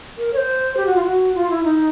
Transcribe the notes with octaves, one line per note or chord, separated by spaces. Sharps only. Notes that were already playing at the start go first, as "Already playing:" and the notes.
A#4
C#5
C5
G4
F#4
F4
F#4
F4
E4
D#4